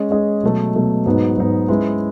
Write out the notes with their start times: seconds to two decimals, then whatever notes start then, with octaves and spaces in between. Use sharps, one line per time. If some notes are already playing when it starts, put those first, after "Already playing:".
Already playing: G#3 C#4 G#4 D#5
0.11 G#3 C#4 G#4 D#5
0.43 B2 F#3 A3
0.75 B2 F#3 A3
1.06 G#2 F#3 B3 D#4
1.38 G#2 F#3 B3 D#4
1.68 G#3 C#4 E4 B4